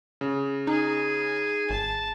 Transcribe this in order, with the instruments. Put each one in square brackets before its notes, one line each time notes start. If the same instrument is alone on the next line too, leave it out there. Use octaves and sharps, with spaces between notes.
[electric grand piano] C#3
[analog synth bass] D#4 [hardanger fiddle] G#4
[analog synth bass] G#1 [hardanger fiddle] A5